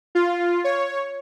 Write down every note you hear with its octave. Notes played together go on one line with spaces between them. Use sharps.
F4
C#5